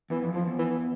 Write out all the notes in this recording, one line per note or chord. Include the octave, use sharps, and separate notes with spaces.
E2 E3
F2
F2 F3
E2
E3